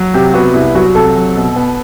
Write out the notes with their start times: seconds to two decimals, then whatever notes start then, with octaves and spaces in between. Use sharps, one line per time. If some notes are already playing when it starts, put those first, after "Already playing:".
Already playing: F#3
0.14 C3 G4
0.34 B3 F#4
0.54 C2 E4
0.75 F#3 F#4
0.95 C3 A4
1.16 F#3
1.36 B2
1.56 B3